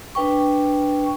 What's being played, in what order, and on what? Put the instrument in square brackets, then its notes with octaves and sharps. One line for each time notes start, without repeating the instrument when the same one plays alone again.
[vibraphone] D4 B4 G5 C#6